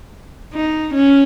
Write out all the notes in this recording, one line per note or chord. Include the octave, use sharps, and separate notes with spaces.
D#4
C#4